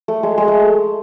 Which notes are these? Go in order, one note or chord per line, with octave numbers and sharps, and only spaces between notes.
A3
G#3
G#3
A3